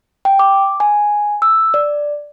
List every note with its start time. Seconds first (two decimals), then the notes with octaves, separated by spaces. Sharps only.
0.25 G5
0.39 D6
0.80 G#5
1.42 E6
1.74 D5